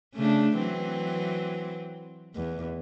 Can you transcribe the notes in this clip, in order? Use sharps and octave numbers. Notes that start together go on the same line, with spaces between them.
C#3 A3 D4
E3 F#3 C4
E2